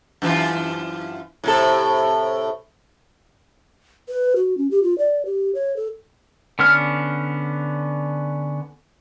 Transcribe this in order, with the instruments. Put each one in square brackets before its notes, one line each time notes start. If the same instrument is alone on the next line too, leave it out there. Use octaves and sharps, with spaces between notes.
[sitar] F#2 E3 F4
A2 C3 A4
[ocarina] B4
F#4
C#4
G4
F4
D5
G4
C#5
A4
[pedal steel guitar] D3 B3 C#4 F6